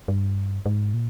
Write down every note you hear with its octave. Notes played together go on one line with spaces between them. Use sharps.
G2
G#2
A#2